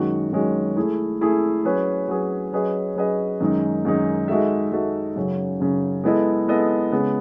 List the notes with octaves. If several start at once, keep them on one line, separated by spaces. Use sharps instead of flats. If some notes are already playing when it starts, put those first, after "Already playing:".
Already playing: F#2 D#3 G#3 C#4 F#4
F#2 D#3 G#3 C#4 F#4
A3 E4 G#4
A3 E4 G#4
F#3 C#4 G#4 B4
F#3 C#4 G#4 B4
F#3 C#4 G#4 B4 D#5
F#3 C#4 G#4 B4 D#5
F#2 D#3 G#3 D#4
F#2 D#3 G#3 D#4
G#3 D#4 F#4 A4 E5
G#3 D#4 F#4 A4 E5
F#2 C#3 F#3
F#2 C#3 F#3
G#3 B3 E4 A4 D#5
G#3 B3 E4 A4 D#5
C#3 G#3 B3